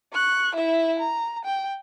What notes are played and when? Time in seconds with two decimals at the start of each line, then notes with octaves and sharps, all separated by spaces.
0.14 C#6 F#6
0.56 E4 E5
1.00 A#5
1.45 G5